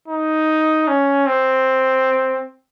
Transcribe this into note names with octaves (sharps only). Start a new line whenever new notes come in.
D#4
C#4
C4